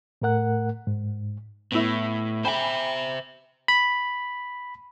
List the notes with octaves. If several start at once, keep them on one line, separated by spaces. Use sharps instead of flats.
A2 A3 A#4 F#5 F#6
G#2
A2 B3 E4
C5 E5 G5 G#5 B5
B5